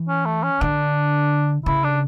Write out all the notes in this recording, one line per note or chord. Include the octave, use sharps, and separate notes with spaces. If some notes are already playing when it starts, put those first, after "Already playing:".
Already playing: E3
C#4
A3
C#4
D3 D4
C#3 E4
D4